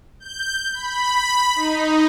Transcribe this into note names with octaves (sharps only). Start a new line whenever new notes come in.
G6
B5
D#4